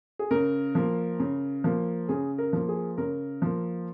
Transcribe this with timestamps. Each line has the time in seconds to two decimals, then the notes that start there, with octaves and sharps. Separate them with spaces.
0.19 G#4
0.31 C#3 A#4
0.75 F3 A#3
1.20 C#3
1.64 F3 A#3
2.09 C#3 G#4
2.38 A#4
2.53 F3 A#3
2.69 G#4
2.98 C#3 A#4
3.42 F3 A#3